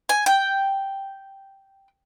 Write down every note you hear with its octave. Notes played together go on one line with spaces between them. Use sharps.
G#5
G5